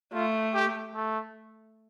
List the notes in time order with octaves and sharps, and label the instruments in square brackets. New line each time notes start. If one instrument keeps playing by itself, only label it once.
[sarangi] A3 [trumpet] F4
[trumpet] G4
A3